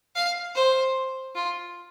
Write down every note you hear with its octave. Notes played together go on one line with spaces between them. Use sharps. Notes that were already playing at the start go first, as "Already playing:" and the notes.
F5
C5
F4